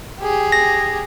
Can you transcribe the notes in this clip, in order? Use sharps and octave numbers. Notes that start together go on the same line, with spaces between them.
G4 G#4
A#6